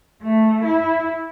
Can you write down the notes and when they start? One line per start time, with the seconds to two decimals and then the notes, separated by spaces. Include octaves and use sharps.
0.24 A3
0.64 E4